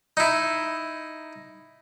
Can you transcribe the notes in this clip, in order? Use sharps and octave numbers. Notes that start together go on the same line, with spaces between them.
D#4 E4